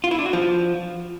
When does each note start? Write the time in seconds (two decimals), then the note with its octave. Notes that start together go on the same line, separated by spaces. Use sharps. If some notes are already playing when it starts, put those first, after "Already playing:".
0.04 F4
0.11 E4
0.18 D4
0.26 F#4
0.33 F3